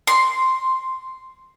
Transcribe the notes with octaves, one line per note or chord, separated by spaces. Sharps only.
C6